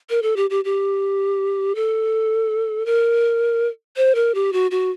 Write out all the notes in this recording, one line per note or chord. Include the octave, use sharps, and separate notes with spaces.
A#4
A4
G4
G4
G4
A4
A#4
C5
A#4
G4
F#4
F#4